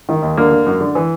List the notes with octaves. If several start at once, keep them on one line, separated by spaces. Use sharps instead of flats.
D#3
D#2
D3 A#3
D3
F#2
D3
E3